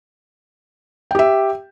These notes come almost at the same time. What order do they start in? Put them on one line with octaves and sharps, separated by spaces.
G5 G4 E5